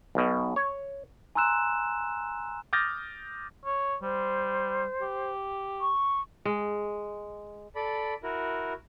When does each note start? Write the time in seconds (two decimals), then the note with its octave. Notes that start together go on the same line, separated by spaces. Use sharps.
0.15 B1 B2
0.56 C#5
1.35 G#5 A#5 C6 E6 F#6 E7
2.73 D6 D#6 F6 G6 A6 A#6
3.65 C#5
4.02 G3 C5
5.01 G4
5.81 C#6
6.45 G#3
7.75 A4 D5 B5
8.23 E4 F#4 A#4